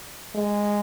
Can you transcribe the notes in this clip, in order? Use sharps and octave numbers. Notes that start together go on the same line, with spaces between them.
G#3